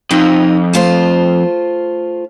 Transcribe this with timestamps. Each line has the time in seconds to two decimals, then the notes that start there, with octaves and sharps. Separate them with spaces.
0.11 F2 D#4
0.73 A3 F4 C5